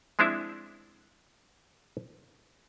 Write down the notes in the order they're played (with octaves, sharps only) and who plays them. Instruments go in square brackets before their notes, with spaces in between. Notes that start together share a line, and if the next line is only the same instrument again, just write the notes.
[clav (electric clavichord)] F3 G#3 C4 D4 E4 E5